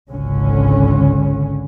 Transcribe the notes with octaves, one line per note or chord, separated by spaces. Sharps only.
G#1 C#2 D3 C#4